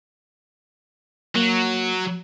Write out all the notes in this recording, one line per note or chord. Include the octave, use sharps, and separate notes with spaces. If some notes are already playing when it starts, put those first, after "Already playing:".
F#3 A#3